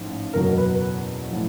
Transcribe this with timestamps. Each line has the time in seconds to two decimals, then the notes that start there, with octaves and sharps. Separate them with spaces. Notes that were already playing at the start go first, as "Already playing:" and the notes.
Already playing: A1 G#2 F3
0.33 F#1 E2 B2 F#3 A#4
0.57 B4
1.31 A2 F3